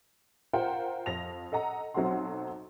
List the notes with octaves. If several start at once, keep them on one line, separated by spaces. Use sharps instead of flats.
F4 A#4 C5 F#5 G5
F2 A#6 F7
A4 D#5 F#5 A#5
B1 F#3 C4 A4 F#5 C6